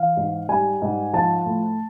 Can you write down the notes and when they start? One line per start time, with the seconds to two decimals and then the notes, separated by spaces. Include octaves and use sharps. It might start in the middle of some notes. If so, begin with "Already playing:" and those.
Already playing: E3 F5
0.17 G#2
0.49 G3 G#5
0.82 G#2
1.13 F3 A5
1.46 A2